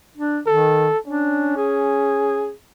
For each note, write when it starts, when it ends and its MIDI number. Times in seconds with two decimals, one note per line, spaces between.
0.17 0.40 62
0.47 0.89 51
0.47 0.98 69
1.06 2.53 61
1.06 1.53 62
1.57 2.52 68